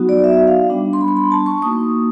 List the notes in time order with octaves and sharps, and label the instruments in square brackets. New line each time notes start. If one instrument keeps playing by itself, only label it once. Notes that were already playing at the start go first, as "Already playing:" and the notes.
Already playing: [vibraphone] F#3 B3 D#4 F#4
D5
E5
F5
G3 B3 D4
C6
B5
C6
B5
A5
C#6
A#3 D#4 F#4 D#6